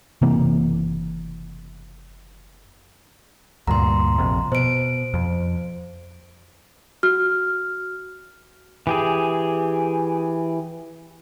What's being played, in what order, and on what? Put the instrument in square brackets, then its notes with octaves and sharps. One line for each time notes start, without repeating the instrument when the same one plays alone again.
[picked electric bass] F#1 C3 E3 A#3
[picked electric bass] D2 G2 A#2 [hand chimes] A#5 C6
[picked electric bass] A#1 F2 C3
[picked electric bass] B2 [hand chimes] C5 D7
[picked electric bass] F2
[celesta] F#4 F6
[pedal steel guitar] E3 G4 G#4